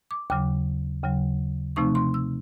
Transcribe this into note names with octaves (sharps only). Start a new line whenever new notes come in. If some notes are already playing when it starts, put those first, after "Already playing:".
D6
D#2 C#3 F#3 D6
D#2 C#3 F#3
C3 F3 A3 C4 D#4 C#6
C6
E6